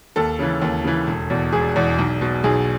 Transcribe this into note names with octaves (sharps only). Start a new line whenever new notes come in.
D#2 A4
C#3 E3
D#2
C#3 E3
E1
E2 B2
E1 G#4
E2 B2
B1
B2
B1 G#4